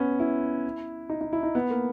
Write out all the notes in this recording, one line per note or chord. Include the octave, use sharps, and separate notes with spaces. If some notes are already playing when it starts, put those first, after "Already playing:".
Already playing: B3 C#4
E4
D#4
D#4
E4
D#4
B3
A#3